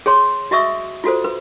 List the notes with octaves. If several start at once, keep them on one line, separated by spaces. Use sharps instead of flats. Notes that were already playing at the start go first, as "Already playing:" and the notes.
G#4 C#5 C6
F#4 D#5 E5 C#6 D#6 E6
F4 F#4 A4 C5
B4